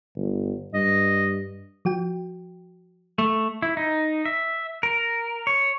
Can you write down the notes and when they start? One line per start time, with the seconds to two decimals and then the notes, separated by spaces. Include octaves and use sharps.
0.15 G1
0.74 G2 D#5
1.85 F3 F#4 G5
3.18 A3
3.62 E4
3.77 D#4
4.25 E5
4.83 A#4
5.47 C#5